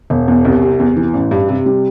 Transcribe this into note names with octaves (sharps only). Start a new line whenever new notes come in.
E1
E2
C2
C3
E2
E3
A1
G2
C3
G3